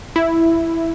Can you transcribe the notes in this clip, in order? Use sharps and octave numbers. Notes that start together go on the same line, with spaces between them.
E4